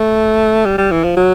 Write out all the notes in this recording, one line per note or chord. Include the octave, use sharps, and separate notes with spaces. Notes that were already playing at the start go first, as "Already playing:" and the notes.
Already playing: A3
G3
G3
E3
F3
F#3